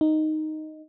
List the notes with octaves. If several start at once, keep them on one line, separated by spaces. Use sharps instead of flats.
D#4